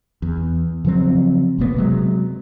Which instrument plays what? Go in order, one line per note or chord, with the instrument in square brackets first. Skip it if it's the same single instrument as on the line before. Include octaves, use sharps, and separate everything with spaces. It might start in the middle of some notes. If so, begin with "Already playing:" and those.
[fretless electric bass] E2
C#3 F3 F#3 C4
F#1 B2 A#3 B3
C3 F#3 G#3